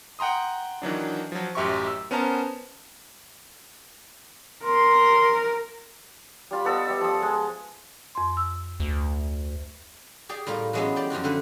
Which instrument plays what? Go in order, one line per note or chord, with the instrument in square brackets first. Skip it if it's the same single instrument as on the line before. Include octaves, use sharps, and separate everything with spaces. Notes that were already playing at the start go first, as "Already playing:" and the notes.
[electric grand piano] F#5 G5 A#5 C6 D#6
D#3 E3 F#3 D4
F3 F#3
A1 F#2 G4 E5 C6 C#6
E6
B3 C#4 A#4 C5 A5 A#5
[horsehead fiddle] A#4 [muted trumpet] C6
[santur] G3 F4 B5
B3 A4 D#5 E6
G3 E5
F3 D#6
G#3
[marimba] F2 C6
E6
[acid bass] D2
[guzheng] G4 G#4 D5 G#5
A2 G3 F4 A#4
E3 F#3 G#3 B3 C#4 E4
G4 D5
F#2 F3 F4 F#4
D3 C4 D4 B4